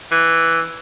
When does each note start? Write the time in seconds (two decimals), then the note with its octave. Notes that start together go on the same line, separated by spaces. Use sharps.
0.11 E3